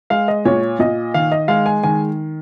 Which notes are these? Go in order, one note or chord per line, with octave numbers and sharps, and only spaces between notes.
G#3 F5
D#5
A#2 C#5
A#2 D#5
D#3 F5
D#5
G#3 F5
G#5
D#3 G#5